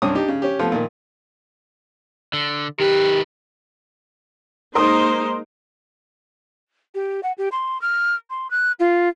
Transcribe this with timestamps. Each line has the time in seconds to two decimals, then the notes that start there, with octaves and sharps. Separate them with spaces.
0.02 C2 G2 C#4 D4 D#6
0.15 D4 D#4 G4
0.28 C#3
0.42 C#4 G4
0.59 F3 A3 B3
0.72 A#2 D#3
2.33 D3
2.80 D#3 G4 B4
4.75 G#3 A#3 D#4 A#4 C5 C6 D#6
6.95 G4
7.23 F#5
7.38 G4
7.52 C6
7.81 F6
8.30 C6
8.51 F#6
8.80 F4